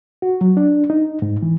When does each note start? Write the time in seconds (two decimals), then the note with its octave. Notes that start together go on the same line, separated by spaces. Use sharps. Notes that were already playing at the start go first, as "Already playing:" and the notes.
0.22 F#4
0.41 F#3
0.57 D4
0.90 D#4
1.22 G#2
1.43 E3